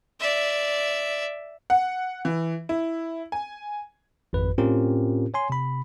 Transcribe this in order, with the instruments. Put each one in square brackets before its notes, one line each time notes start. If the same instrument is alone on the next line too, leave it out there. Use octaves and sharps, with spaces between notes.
[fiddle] D5 E5
[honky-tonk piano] F#5
E3
E4
G#5
[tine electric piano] G#1 F2 B4
A2 C4 C#4 F4 G4 A#4
C#5 G#5 C6
C3 B5